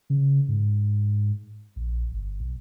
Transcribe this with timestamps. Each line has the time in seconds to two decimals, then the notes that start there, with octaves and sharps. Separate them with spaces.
0.10 C#3
0.48 G#2
1.76 A#1
2.11 G1
2.40 B1